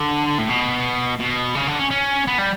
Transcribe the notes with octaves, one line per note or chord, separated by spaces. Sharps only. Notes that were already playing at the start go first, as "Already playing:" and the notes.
Already playing: D3
A2
B2
B2
C#3
D3
C#4
C#4
B3
G3